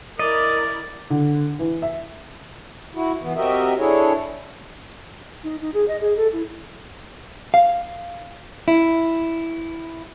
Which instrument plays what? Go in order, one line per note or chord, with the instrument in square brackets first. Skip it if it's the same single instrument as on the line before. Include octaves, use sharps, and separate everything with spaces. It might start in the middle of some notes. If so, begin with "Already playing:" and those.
[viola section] E4 A#4 [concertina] D5 [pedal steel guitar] D#5 [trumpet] D6
[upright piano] D3
E3
E5
[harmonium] E4 F#4
E3 B3
C4 F#4 G4 A#4 D#5 E5
D4 E4 G#4 A4 C#5
[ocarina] D#4
D#4
G#4
D#5
G#4
A4
E4
[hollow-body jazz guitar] F5
E4